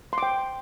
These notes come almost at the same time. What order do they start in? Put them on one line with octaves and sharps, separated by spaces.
C6 D6 G5